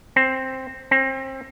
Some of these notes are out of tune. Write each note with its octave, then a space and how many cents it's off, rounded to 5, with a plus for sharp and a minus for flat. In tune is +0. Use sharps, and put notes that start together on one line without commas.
C4 +5
C4 +30